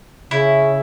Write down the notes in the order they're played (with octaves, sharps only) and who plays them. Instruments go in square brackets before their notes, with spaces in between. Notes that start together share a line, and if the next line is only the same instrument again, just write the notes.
[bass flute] C#3 [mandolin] E4